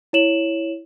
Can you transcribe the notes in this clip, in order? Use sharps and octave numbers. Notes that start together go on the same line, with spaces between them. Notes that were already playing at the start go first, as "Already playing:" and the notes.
E4 C#5 E7 F#7